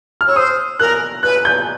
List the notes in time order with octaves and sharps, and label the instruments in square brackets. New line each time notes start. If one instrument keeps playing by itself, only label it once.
[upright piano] F6
[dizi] C#5 [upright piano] E6
[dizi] C5 [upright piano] D#6
[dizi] A#4 [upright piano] F#6
[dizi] B4 [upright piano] F#6
[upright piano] G6